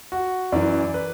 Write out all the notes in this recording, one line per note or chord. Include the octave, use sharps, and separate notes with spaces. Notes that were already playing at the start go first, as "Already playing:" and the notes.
F#4
F#2 E3 D5
B4